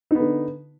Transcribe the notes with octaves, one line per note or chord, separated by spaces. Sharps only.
D3 B3 D#4